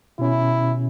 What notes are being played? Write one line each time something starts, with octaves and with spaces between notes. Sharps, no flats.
B2 C#4 E4